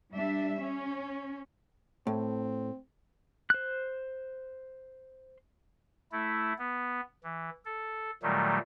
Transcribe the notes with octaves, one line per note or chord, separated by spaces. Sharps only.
G3 D4 E5
C#4
A2 C4
C5 F#6
A3 E4
B3
E3
A4
A#2 D#3 F#3 G3 A3